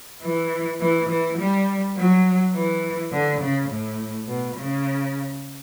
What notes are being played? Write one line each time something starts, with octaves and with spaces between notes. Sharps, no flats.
E3
E3
E3
G3
F#3
E3
D3
C#3
A2
B2
C#3